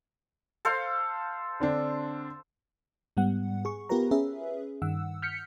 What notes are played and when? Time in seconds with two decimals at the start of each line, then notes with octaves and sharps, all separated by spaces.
0.65 A4 C5 F5
1.60 D3 C4 D4
3.17 G#2 G3 B3 F#5
3.65 G#4 C#6
3.89 B3 F4 G4 A#4 B4 A#5
4.11 C#4 G#4 B4 E5
4.82 G2 D#3 F#5 E6
5.22 F6 G6 B6 C#7